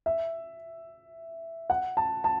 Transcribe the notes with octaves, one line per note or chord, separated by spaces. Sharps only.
E5
F#5
A5
A5